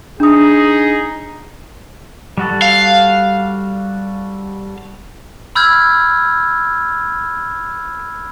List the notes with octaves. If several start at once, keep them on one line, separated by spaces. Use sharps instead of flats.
D4 D#4 G#4 D#6
G3 F#4 A4
F5
B5 E6 F6 G6 G#6